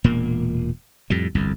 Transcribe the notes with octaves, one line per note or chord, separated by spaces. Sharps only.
E1 A#2 A#3
F2 A2 G3
G1 C2 F2